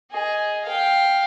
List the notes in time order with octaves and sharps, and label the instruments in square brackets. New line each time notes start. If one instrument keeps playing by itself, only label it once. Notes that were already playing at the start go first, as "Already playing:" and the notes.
[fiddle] G#4 D#5
F5 G5